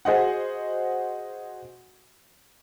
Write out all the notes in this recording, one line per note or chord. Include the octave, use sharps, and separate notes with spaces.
F#4 G#4 C5 D#5 F#5